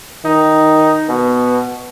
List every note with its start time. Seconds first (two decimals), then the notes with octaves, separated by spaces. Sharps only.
0.25 D#3 D#4
1.09 B2 B3